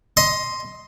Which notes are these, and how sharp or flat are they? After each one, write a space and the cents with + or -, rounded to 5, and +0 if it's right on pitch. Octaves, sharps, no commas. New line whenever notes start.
D#5 +20 C6 +0